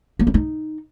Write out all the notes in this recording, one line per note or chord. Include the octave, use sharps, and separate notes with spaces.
A#3
C#4
D#4